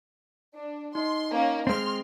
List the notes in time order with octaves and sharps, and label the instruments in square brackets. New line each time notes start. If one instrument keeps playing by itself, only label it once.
[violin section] D4
[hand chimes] D#4 D#5 [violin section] C6
[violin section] A#3 C#4
[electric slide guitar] G#3 C4 [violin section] C6 F6